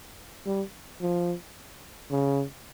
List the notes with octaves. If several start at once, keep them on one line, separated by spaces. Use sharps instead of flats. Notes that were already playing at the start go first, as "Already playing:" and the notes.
G3
F3
C#3